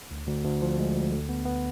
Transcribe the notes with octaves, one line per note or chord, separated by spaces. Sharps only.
D2
D2
D2
F3
G#3
D2
D3
B3
B3